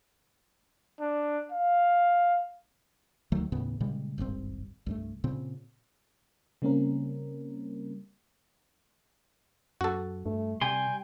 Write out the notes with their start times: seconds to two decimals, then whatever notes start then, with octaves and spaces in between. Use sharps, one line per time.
1.00 D4
1.52 F5
3.32 D2 D#3 F#3 A3
3.52 D#2 A2 C#3 B3
3.80 A#2 C#3 G3 G#3
4.18 D#1 G#1 G2 C4
4.86 C2 G2 A3
5.24 A#2 C#3 C4
6.62 C#3 G3 A#3 C4 C#4 A#4
9.81 F#2 F#4 A4
10.26 G2 A3
10.61 C3 G3 G5 G#5 C6